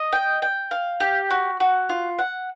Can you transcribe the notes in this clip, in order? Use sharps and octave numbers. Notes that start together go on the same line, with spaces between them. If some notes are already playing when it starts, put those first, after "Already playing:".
Already playing: D#5
G5
G5
F5
G4
F#4
F#4
F4
F#5